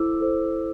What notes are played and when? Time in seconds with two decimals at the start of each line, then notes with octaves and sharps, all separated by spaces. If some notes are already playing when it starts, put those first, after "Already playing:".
Already playing: E4 A4 C5 D6 E6
0.20 A4 C5